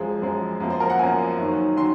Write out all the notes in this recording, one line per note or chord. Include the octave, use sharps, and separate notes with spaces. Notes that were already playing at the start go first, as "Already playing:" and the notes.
Already playing: F#2 F3 G#3 G#4
F#2 F3 G#3
F#2 F3 A#3
C5
A#4
F#5
F#2 F3 A#3 G#5
F#2 D#3 F#3
D#3 F#3 C6